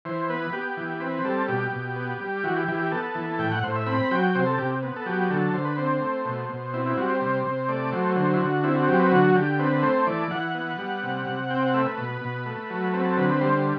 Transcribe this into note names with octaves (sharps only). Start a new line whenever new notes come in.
E3 C5
B3 B4
B3 G4
E3
C4 B4
G3 A4
B2 G4
B2
B3
G3
E3 F#4
G4
E3 G4
G4
B3 A4
E3
A2 G5
F#5
A2 C5
E5
C4 B5
F#3 G5
C3 C5
A4
C3 G4
B3
A4
F#3 G4
D3 A4
D3 C5
B4
C4 C5
A3
B2
B2
C4 E4
E4
G3 F#4
C5
C3 C5
C3
A3 D5
F#3 C5
D3 C5
E4
D3 F#4
C4 E4
F#4
F#3 G4
B4
D3 F#4
D3 G4
C4 B4
A3 C5
E3 D5
E3 F#5
B3
G3
C3
C3
C4 G5
F#5
A3 E5
B4
B2
B2
A3
F#3
C4 B4
A4
D3 B4
B4
G3 C5